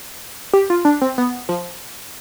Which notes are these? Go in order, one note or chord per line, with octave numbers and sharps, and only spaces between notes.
G4
F4
D4
C4
B3
F3